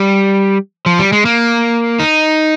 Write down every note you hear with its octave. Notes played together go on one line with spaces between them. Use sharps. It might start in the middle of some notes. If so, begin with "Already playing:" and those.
Already playing: G3
F3
G3
G#3
A#3
D#4